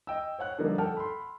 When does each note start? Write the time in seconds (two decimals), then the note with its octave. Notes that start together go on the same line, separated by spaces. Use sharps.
0.07 D#5 G5 E6
0.39 C5 C#5 F#5 F#6
0.59 D3 F3 G3 A#3 D#4
0.78 A4 F#5 G5 A5 F6
0.97 B5 C6